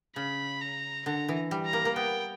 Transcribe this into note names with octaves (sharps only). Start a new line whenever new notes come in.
C#3 B5
A#5
D3 A#5
E3
G3
A#5
A#3
A#3
B3 G5